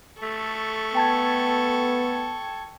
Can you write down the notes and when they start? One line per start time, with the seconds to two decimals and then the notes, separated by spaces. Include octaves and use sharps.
0.22 A3 A4 C#6
0.95 B3 G5 A5 G#6